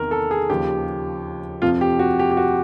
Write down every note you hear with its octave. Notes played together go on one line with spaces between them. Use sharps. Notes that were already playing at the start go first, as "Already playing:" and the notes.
Already playing: E2 C3 D#3 A#4
A4
G#4
D#2 C#3 F3 G4
F2 C3 F3 F4
G4
F#4
G4
G4
F#4